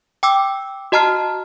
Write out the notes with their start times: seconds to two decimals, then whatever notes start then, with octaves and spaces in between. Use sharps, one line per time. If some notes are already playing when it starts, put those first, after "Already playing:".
0.23 G5 D6 E6
0.92 F#4 D#5 A5 A#5 F6 C7